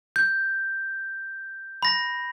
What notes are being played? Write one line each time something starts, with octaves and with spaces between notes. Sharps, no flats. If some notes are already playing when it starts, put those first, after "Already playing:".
G6
B5 A#6